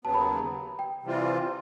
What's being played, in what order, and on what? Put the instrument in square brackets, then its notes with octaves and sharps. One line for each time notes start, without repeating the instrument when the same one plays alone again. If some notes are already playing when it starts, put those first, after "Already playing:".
[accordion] D#2 C#3 F#3 B3 [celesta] A5
[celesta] B5
A#5
G5
[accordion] C3 E3 G3 C4 F4
[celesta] C6
C6